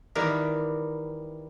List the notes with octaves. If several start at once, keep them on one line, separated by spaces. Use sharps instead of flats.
D#3 E3 G3 B3 A#4